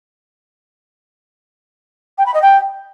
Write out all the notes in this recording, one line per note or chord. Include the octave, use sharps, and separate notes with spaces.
G5
B5
D#5
G5